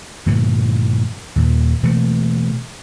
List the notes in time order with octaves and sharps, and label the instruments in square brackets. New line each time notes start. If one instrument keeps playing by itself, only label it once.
[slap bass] G2 A#2 D3 F3
D#2 A#2
B2 E3 A3 A#3